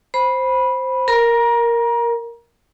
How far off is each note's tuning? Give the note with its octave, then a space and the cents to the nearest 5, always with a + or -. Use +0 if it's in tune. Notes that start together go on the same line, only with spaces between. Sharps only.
C5 +0 B5 -10
A#4 +0 A#5 +30